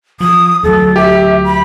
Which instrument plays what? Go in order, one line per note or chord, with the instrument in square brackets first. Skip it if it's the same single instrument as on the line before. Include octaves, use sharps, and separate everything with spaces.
[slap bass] F3 [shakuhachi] D#6
[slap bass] D2 F#3 [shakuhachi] A4
[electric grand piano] G4 [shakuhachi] E5
[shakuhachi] B5